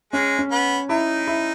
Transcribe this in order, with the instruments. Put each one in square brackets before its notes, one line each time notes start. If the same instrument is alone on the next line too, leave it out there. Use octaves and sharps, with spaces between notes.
[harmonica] G#3 [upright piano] C#4
[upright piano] C#4
[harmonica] B3
[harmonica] D#4 [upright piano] E4
[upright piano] E4